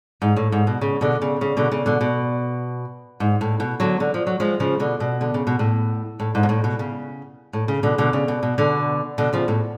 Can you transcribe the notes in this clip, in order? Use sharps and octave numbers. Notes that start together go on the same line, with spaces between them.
G#2
A2
G#2
B2
C#3
B2 D3
C#3
C#3
B2 D3
C#3
B2 D3
B2
G#2
A2
B2
D3 F#3
D3
F3
F#3
F3 G#3
C#3 F3
B2 D3
B2
D3
C#3
B2
A2
A2
G#2
B2
A2
B2
C#3
A2
C#3
B2 D3
B2 D3
C#3
B2
B2
B2 D3
B2 D3
C#3 F3
A2